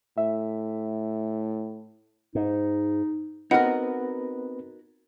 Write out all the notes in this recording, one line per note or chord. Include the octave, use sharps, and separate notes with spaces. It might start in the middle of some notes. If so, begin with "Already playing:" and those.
A2 E5
G#2 D#4
B3 C4 D#4 F#4 A#4 B4 F#5